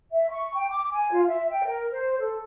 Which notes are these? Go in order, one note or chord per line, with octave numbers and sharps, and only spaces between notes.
E5
C#6
G5
D6
G#5
F4
E5
G5
A#4
C5
A4